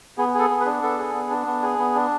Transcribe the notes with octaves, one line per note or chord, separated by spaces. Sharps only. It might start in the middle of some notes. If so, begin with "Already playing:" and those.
B3 G#4
G#4 A4
B3
B4
D4
B3 A4
G#4
B3
D4
B3
G#4
B3
D4